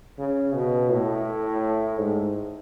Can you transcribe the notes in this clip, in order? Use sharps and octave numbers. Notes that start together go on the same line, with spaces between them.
C#3
B2
A2
G#2